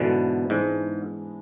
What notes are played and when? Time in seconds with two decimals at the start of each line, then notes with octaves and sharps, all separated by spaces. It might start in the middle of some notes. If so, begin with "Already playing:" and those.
Already playing: G#2 B2 D3 E3 B3
0.50 G#2 E3 G#3 D4